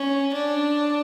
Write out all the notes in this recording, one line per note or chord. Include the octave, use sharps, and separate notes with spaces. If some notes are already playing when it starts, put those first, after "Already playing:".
Already playing: C#4
D4